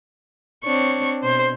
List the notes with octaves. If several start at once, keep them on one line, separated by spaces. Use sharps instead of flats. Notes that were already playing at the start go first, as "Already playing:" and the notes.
C4 D4 C#5 C#6
B2 C5